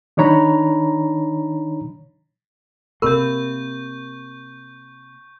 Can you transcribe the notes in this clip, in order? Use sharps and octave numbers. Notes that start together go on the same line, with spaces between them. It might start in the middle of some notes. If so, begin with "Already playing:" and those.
D#3 D4 D#4 C#5 A#5 B5
C3 A#3 A#4 B5 C#6 G6